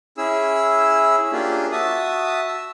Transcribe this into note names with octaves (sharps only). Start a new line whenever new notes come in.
C#4 E4 G#4 E6
A#3 C#4 D4 F4 G4 G#4
F#4 E5 A5 D#6
E6